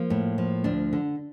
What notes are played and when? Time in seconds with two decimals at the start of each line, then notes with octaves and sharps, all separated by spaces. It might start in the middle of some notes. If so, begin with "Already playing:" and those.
Already playing: F3 A#3
0.10 A2
0.38 F3
0.64 D2 D4
0.93 D3